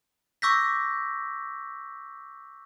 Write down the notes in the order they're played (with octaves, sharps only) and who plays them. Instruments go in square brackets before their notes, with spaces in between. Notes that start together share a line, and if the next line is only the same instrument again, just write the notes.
[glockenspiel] C#6 D6 E6 G6 A#6 B6